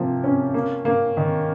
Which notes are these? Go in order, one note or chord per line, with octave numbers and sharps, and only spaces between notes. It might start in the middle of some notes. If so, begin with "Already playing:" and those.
Already playing: C3 F3 A#3
C#4
A#3
A#3
D#3